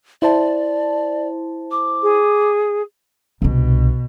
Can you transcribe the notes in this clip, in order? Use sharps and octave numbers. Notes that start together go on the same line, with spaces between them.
E4 C5 D5 A5
D6
G#4
C2 B2 D4